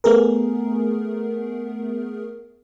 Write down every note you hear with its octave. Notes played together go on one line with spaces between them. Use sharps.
A3 B3 G#4 A#4